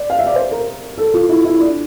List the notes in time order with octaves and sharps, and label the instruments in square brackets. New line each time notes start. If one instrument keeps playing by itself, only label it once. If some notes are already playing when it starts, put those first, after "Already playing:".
Already playing: [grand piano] D5
F5
E5
D5
C5
A#4
A4
F4
E4
E4
D4